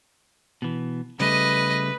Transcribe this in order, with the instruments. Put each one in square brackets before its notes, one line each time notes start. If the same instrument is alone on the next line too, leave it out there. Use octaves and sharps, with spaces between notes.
[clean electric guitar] B2 E3
[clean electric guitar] C#3 G3 A3 [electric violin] B4 [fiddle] D#5